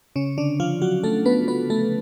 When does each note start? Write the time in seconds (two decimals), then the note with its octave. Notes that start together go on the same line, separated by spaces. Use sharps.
0.16 C#3 C#4
0.38 D3 D4
0.60 F3 F4
0.82 F#3 F#4
1.03 A3 A4
1.26 B3 B4
1.48 B3 B4
1.70 A3 A4